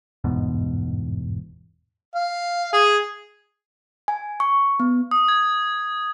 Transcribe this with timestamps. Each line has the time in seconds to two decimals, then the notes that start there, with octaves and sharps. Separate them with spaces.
0.24 G1 E2 G#2 B2
2.15 F5
2.73 G#4
4.08 G#5
4.40 C#6
4.80 B3
5.11 D#6
5.28 G#6